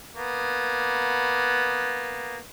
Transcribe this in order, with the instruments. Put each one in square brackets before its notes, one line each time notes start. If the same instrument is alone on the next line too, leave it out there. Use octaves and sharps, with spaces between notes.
[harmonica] A#3 B3